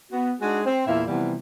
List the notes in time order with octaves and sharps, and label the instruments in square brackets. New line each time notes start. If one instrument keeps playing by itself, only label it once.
[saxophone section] B3 F#4
G#3 D4 D#4 F#4 G#4
C4
E2 A#2 E3 E4 E5 F5
C3 E3 F3 G3 B3